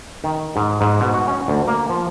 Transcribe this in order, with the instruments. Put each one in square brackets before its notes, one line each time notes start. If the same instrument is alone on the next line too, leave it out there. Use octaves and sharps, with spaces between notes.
[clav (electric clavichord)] D#3
G#2
G#2
B2
F#4
C#4
D2
A#3
F3